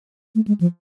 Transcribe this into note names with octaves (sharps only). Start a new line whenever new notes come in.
A3
G#3
F3